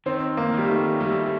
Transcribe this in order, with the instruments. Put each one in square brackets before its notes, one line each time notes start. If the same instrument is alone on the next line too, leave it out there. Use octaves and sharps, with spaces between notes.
[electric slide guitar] D#3 [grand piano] C4
[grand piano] A#3
[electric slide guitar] D#3 [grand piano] G3
[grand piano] A3
[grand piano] G3 [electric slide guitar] A3